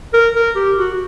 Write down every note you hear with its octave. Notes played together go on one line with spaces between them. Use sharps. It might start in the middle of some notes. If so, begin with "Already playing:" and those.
A#4
A#4
G4
F#4